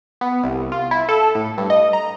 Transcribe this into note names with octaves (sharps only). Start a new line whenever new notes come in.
B3
C2
F4
E4
A4
A2
G2
D#5
A#5